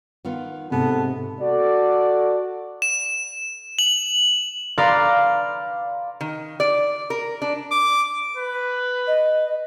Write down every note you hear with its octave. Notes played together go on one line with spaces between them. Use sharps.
D#3 B3 F4
G#2 C3 B3 A4
F#4 A4 D5
E7
F#7
B4 D5 F5 A#5 C6
D#3
D5
A#4
D4
D6
B4
D#5